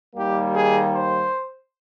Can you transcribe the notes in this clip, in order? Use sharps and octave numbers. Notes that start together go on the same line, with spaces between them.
D#2 D#3 G3 A#3 G4
G#4
C5